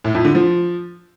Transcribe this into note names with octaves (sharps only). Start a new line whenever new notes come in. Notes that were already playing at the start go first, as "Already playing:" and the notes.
A2
F2
D3
F3